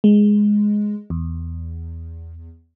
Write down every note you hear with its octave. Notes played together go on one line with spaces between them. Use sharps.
G#3
E2